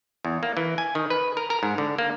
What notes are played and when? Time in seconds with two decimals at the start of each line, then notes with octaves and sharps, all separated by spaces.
0.25 E2
0.43 A#3
0.57 E3
0.78 G#5
0.95 D#3
1.10 B4
1.37 A#4
1.50 A#4
1.63 G#2
1.78 D3
1.98 A#3